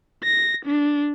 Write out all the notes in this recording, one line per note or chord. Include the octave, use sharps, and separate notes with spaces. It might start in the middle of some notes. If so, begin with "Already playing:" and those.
A#6
D4